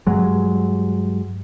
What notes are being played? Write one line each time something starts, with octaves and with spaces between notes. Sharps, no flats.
G2 F#3 G#3